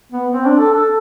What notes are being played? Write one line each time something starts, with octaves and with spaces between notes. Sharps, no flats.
B3
C4
D4
A4
A4